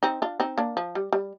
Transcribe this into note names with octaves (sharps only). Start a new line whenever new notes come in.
C4 D#4
D4 F4
C4 D#4
A#3 D4
F3
G3
G3